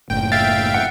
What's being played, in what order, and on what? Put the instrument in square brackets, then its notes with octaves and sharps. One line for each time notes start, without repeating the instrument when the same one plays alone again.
[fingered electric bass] F#1 A2 [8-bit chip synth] G5
[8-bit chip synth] E5 F5 G5 [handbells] A6
[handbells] F#5